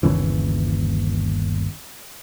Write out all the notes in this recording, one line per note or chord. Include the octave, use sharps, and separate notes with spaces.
G1 D#2 C#3 E3